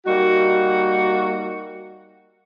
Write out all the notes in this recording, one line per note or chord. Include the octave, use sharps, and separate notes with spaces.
G3 A#3 D#4 F#4